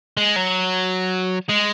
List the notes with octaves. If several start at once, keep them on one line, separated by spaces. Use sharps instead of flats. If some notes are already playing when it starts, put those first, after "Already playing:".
G#3
F#3
G#3